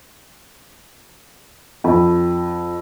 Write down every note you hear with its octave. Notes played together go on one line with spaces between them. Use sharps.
F2 B5